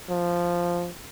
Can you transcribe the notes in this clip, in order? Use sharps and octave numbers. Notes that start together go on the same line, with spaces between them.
F3